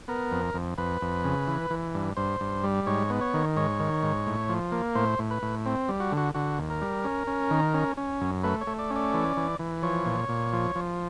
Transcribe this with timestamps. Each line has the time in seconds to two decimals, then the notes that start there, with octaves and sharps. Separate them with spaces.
0.08 B3 A#4
0.32 F2
0.55 F2
0.78 F2 B4
1.02 F2
1.24 C#3
1.47 E3
1.70 E3
1.94 G2
2.17 G2 C5
2.40 G2
2.64 G3
2.87 G#2 C#5
3.10 B3
3.21 C#5
3.34 D#3
3.57 G#2 C#5
3.80 D#3
4.03 G#2
4.27 A2
4.49 F3
4.72 A#3
4.95 A2 C5
5.19 A2
5.31 B4
5.43 A2
5.66 C4
5.89 G3
6.00 F#4
6.12 D3
6.17 F#4
6.34 D3 F#4
6.58 D#2
6.70 A#4
6.82 G3
7.04 C#4
7.27 C#4
7.51 D#3
7.74 C#4
7.97 C#4
8.21 F#2
8.44 A3 B4
8.61 C#5
8.67 A3
8.79 D5
8.90 C#4
8.96 D5
9.14 E3
9.37 E3
9.59 E3
9.83 F3 C#5
10.06 A#2
10.29 A#2
10.53 F3
10.75 F3